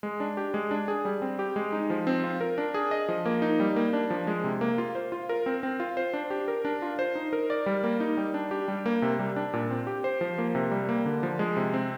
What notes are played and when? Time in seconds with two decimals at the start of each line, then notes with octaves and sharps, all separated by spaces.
0.03 G#3
0.20 D4
0.37 G4
0.54 G#3
0.71 D4
0.88 G#4
1.05 G3
1.22 C4
1.39 G4
1.56 G#3
1.73 D#4
1.90 F3
2.07 C4
2.24 F4
2.41 A#4
2.58 D4
2.74 G#4
2.91 D#5
3.09 F3
3.26 A#3
3.42 D#4
3.60 G3
3.76 A#3
3.93 D4
4.10 F3
4.27 G#3
4.44 C3
4.61 A#3
4.78 F4
4.95 C5
5.12 F4
5.29 A#4
5.46 C4
5.63 C4
5.80 F4
5.97 C5
6.13 D4
6.30 G4
6.48 A#4
6.65 D4
6.82 F4
6.99 C5
7.15 D#4
7.33 A#4
7.50 D5
7.66 G3
7.84 A#3
8.00 D#4
8.17 G3
8.34 D4
8.51 G4
8.68 G3
8.86 A#3
9.02 C3
9.19 G3
9.36 D4
9.53 A#2
9.70 C4
9.87 G4
10.04 C5
10.21 F3
10.38 A#3
10.55 C3
10.71 G3
10.89 A#3
11.06 D3
11.23 F3
11.39 G#3
11.57 C3
11.74 C4